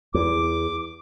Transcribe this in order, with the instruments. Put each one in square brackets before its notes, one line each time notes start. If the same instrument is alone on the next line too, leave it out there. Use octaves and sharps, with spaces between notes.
[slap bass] E2 [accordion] D6